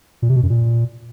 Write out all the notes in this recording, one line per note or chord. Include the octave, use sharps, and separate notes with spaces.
A#2
C3
B2
F#2
A#2